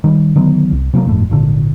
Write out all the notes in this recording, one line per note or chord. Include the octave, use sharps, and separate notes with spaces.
D#3 G3
D3 D#3 F#3 B3
C2
C3 F#3 A3 A#3
G1 F2 A2
G#1 A#2 D3